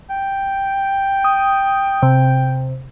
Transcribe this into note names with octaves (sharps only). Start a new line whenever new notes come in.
G5
D#6
C3